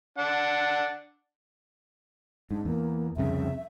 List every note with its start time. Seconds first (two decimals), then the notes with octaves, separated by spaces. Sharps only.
0.18 D4 F#5
2.51 G#2 D4
2.65 E2 A#3
3.17 C2 F2 C#3 E5